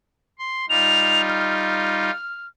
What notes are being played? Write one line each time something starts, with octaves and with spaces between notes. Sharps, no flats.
C6
G3 D#4 F4 F7
F6
F6